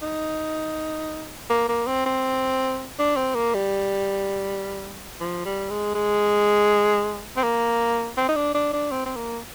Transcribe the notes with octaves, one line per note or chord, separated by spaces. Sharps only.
D#4
A#3
A#3
C4
C4
D4
C4
A#3
G3
F3
G3
G#3
G#3
C4
A#3
C4
D#4
D4
D4
D4
C4
C4
A#3